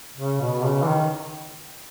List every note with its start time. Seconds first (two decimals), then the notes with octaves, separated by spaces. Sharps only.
0.17 C#3
0.41 B2
0.65 C#3
0.83 E3
0.88 D#3